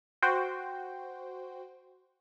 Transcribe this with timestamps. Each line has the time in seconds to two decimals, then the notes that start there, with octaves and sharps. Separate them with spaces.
0.22 F#4 C5 G5